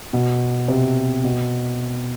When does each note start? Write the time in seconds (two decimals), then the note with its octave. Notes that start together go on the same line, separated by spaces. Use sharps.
0.13 B2
0.68 C3
1.24 B2